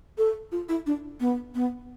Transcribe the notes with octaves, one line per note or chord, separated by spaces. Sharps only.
A4
F4
E4
D4
B3
B3